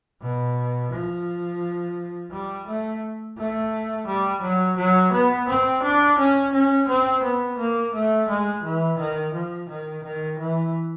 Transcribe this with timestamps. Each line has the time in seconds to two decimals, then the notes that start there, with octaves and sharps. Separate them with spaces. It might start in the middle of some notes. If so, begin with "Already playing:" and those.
0.22 B2
0.92 F3
2.31 G3
2.67 A3
3.37 A3
4.07 G3
4.42 F#3
4.77 F#3
5.12 B3
5.48 C4
5.83 D4
6.18 C#4
6.52 C#4
6.88 C4
7.23 B3
7.58 A#3
7.93 A3
8.28 G#3
8.63 E3
8.98 D#3
9.34 F3
9.69 D#3
10.03 D#3
10.39 E3